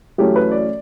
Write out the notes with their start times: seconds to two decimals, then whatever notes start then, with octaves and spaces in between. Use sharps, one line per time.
0.18 F#2 E3 A3 C#4 G4
0.36 B4
0.51 D5